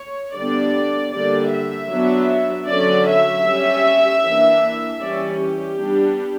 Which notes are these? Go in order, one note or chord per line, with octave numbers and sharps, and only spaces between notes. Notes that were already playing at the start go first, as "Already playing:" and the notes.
Already playing: C#5
D3 G3 B3 D4 D5
D3 G3 A#3 D5
E5
F#3 B3 D4
D3 F#3 C#4 D5
E5
G3 C#4
E3 A#3 D4
E3 G3 C#4 D5
G4
G3 B3 D4